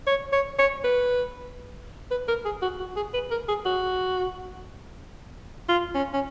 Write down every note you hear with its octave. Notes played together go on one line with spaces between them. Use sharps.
C#5
C#5
C#5
B4
B4
A#4
G#4
F#4
F#4
G#4
B4
A#4
G#4
F#4
F4
C#4
C#4